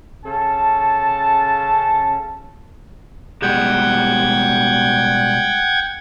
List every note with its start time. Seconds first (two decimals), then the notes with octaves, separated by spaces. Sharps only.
0.25 C#3 C#4 A4 A5
3.42 B2 G3 G#3 F#5 G5 G#6